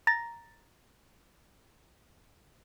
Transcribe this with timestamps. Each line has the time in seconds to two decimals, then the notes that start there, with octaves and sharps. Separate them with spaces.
0.07 A#5 A6 A#6